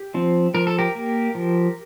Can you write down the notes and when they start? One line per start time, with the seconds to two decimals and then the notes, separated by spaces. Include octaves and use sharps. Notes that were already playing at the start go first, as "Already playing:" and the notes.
Already playing: G4
0.14 F3 C4
0.54 F3 A#4
0.67 A4
0.79 G4 A#4
0.95 A#3
1.35 F3